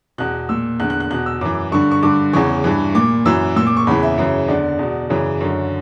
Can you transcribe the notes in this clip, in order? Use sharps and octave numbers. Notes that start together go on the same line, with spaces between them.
E2 B2 F#6
A#2 E6
E2 D3 F#6
F#6
F#6
E2 B2 F#6
E6
F#2 E3 D6
G2 D3 C#6
C#6
G2 D3 D6
E2 C#3 E3 C#6
G2 E3
A#2 D6
F#2 E3 E6
A#2 E6
D6
C#6
E2 C#3 E3 B5
E5
F#2 C#3 E3
E2 D3 D5
E2 B2
F#2 C#3 E3
F#2 D3 C#5